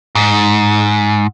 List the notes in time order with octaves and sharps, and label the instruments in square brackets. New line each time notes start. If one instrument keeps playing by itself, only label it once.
[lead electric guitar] G#2